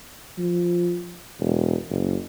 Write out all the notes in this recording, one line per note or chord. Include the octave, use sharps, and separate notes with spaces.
F3
E1
F#1